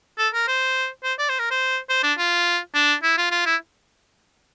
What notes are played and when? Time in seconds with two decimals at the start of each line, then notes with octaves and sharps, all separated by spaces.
0.18 A4
0.34 A#4
0.48 C5
1.03 C5
1.18 D5
1.29 C5
1.39 A#4
1.51 C5
1.89 C5
2.03 D4
2.18 F4
2.74 D4
3.03 E4
3.17 F4
3.31 F4
3.46 E4